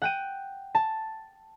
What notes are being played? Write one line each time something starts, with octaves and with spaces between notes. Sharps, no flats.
F#5 G5 D#7
A5